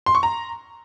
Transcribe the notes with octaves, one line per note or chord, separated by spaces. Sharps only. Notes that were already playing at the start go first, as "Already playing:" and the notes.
C6
C#6
A#5